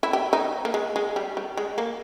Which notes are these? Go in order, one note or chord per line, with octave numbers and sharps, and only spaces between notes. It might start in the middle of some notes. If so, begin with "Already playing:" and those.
E4
G4
D#4
A#3
G#3
G#3
G3
G3
G#3
A#3